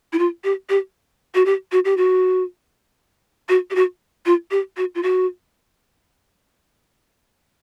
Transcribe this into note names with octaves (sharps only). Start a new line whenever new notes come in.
E4
F4
G4
G4
F#4
G4
F#4
G4
F#4
F#4
G4
F#4
F4
G4
F#4
F4
F#4